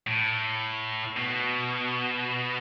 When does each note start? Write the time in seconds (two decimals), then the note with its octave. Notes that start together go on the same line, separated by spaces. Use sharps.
0.07 A2
1.17 B2